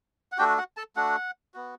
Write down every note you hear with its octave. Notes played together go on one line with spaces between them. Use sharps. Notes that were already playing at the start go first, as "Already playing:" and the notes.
F#5
A3 D4 F#4 G4 G5
F#4 F#5
A4 A5
A3 D4 F#4 F#5
B3 F#4